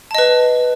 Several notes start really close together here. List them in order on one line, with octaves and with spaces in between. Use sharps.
A5 D#5 B4